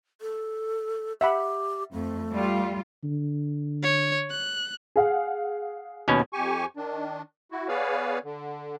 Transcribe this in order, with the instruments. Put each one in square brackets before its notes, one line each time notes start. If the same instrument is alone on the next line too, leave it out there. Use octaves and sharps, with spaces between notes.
[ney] A4
[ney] G4 [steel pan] E5 F#5 B5
[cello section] F2 [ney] A3
[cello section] G3 F4
[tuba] D3
[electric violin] C#5
F#6
[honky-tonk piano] G#4 F5 F#5
[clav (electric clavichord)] D#2 B2 C#4
[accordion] F2 G4 G#5 C#6
D#3 D4
E4 F#4
B3 G#4 B4 C#5 D5 F5
D3